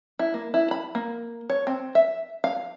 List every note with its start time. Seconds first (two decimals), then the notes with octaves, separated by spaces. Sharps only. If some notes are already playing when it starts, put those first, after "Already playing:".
0.19 E4
0.34 A#3
0.54 E4
0.71 B5
0.95 A#3
1.50 C#5
1.67 C4
1.95 E5
2.44 F5